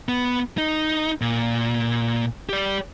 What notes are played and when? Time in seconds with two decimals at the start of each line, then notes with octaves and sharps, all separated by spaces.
0.09 B3
0.58 D#4
1.21 A#2
2.49 G4 D5